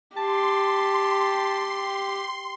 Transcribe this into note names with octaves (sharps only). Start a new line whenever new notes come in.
G4 A5 C6